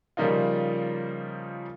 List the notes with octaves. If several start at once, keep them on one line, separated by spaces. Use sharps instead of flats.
C#3 F3 G3 A#3 D#4 F4